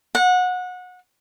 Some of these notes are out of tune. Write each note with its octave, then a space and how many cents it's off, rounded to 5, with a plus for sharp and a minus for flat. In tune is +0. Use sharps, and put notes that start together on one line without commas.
F#5 -25